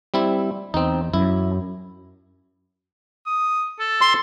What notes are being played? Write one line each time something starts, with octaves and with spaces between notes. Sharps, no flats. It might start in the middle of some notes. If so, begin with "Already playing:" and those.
G3 C4 E4
E2 C4 D#4
F#2 E4
D#6
A4
C6